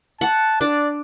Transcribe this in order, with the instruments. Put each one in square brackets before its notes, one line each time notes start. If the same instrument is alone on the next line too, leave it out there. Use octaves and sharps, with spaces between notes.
[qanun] F#5 [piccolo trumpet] A5
[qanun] D4 D6 [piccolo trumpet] D5